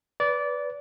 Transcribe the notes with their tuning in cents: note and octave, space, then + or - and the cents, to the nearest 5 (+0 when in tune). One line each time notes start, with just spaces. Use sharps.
B4 +0 D5 -20